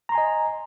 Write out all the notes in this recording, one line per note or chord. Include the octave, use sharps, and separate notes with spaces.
D#5 G#5 A#5 C6